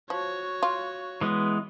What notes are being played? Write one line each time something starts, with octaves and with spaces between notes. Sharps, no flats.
F3 F#4 C#5
F4
E3 G#3 B3